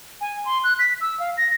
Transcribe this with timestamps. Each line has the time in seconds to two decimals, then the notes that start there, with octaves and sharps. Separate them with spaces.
0.21 G#5
0.45 C6
0.64 F#6
0.79 B6
1.01 E6
1.20 F5
1.37 A#6